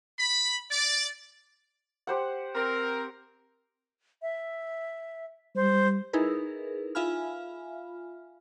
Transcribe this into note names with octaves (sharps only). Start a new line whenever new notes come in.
B5
D5
G4 C5 F#5
C4 A#4
E5
G3 C5
D#4 E4 G#4 A#4 B4
F4 E5 F5 G#5 B5 F6